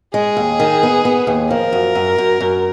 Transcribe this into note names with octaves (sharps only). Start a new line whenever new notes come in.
G#3 G#4
D#2
D#3
B3
B3
D#2
F3 A#4
F#2
F#2
F#2
F#2